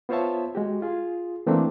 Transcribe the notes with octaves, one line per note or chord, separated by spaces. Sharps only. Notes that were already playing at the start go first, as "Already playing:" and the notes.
B3 F4 C5 C#5 E5 A5
G#3 F#4 G4
F4 G#4
E3 A3 A#3 C4 D4